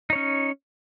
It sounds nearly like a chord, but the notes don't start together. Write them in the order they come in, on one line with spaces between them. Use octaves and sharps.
D#4 C#5 C#4